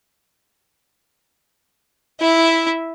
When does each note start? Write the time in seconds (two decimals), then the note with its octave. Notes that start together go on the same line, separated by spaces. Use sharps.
2.20 E4 E5